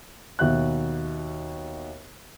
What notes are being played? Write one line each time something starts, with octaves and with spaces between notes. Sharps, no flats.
D#2 B2 E5 F#6